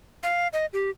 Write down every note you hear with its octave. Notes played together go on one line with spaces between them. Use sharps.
F5
D#5
G4